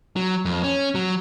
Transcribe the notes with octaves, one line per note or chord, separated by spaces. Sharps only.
F#3
F2
C#4
F#3